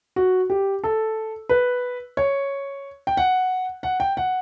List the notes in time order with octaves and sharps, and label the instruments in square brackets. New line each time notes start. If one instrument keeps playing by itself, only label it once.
[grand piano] F#4
G4
A4
B4
C#5
G5
F#5
F#5
G5
F#5